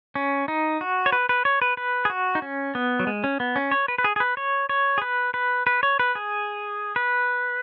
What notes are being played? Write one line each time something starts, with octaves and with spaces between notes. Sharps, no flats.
C#4
D#4
F#4
C#5
B4
B4
C#5
B4
B4
G#4
F#4
D#4
C#4
B3
F#3
G#3
C#4
B3
C#4
C#5
B4
B4
G#4
G#4
B4
C#5
C#5
G#4
B4
B4
B4
C#5
B4
G#4
B4